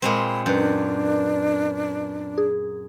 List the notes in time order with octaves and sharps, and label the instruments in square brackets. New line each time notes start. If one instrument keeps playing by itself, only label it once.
[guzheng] A#2 G#3 C4 [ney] B5
[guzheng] F#2 [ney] D4 [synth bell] B4 G6
[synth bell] G#4